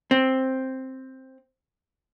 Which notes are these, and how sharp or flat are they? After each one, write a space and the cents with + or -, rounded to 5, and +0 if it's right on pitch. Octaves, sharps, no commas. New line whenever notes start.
C4 +5